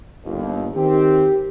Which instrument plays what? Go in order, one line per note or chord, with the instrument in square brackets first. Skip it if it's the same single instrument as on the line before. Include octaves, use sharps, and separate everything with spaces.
[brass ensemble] G1 D#2
[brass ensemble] D#3 C4 [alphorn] G4